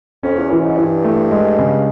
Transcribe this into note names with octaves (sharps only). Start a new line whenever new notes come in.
F2 C#4
E2
F#2 E3
G#2
G2 E3
A3
G#3
C#3